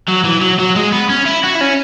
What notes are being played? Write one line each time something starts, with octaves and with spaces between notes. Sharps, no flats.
F#3
E3
F#3
F#3
G#3
B3
C#4
E4
F#4
E4
C#4